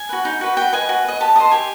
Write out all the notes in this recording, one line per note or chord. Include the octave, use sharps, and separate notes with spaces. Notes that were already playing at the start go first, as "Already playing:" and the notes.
Already playing: G#5
F#4 B4
D#4
F#4 B4
F#4 G5
B4 D#5 G#5
F#4
B4 D#5
G4 A5
C5 D#5 A5
G4 G#5